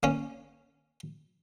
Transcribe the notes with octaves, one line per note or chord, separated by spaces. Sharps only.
A#3 C#4